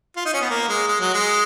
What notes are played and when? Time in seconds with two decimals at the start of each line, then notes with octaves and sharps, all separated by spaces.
0.16 F4
0.25 D#4
0.34 C#4
0.41 B3
0.50 A#3
0.69 G#3
0.88 G#3
1.00 F#3
1.14 G#3